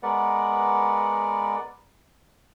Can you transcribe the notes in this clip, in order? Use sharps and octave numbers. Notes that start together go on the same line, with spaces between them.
G#3 B3 A#4 B4 D5 F#5